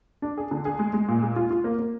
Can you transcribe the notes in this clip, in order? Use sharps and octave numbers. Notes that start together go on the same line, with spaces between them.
D4
G#4
D3
G#4
G#3
G#3
A#2
G#3
F4
F4
A#3
A#3